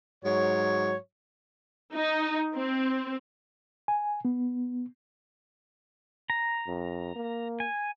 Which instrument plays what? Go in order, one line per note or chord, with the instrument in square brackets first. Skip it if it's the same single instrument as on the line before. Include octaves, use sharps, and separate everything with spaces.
[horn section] G#2 F#3 C#5
[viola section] D#4
C4
[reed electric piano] G#5
B3
[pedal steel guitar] A#5
[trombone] F2
A#3
[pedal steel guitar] G#5